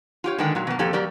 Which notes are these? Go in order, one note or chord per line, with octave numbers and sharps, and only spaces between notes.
F4 G4 C#5
D3 D#3 G#3 A#3 G5
A#2 F#3
B2 A#3
F2 A#3 G4 A4 G5
F#3 G4 A#4 D5